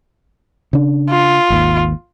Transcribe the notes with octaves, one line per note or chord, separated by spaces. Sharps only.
C#3 D4
F4
G#1 D#2